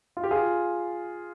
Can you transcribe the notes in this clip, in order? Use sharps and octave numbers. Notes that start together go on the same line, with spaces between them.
F4
G4
F4 G#4